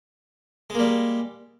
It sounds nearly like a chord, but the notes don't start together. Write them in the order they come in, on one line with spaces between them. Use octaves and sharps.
G#3 A#3 G3